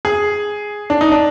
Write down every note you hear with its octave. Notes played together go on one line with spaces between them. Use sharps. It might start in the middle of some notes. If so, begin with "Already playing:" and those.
G#4
D4
D#4
D4